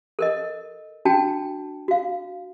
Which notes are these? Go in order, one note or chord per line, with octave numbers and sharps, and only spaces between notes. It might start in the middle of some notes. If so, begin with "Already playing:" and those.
A4 A#4 D#5
D4 F#4 G5 A5
F#4 F5